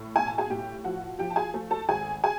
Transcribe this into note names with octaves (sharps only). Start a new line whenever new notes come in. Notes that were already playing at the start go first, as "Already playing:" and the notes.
Already playing: A2
B1 G#5
A5
G#4 G#5
A2 G4 G5
F3 F#4 F#5
F3 G4 G5
A5
G#4 G#5
A3
A4 A5
G#1 G#4 G#5
G#4 G#5